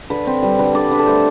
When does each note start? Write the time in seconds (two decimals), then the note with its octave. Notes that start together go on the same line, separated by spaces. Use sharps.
0.10 D3 B4
0.27 C4
0.43 G3 B4
0.59 D3 B4
0.74 D3 D5
0.91 D4 B4
0.99 A4
1.06 A3 C5